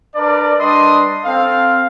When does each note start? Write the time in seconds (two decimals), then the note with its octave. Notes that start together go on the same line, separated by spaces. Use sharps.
0.15 D4 A#4 B4 D5
0.58 G3 D4 B4 D#5 C6 D#6
1.25 C4 A4 F5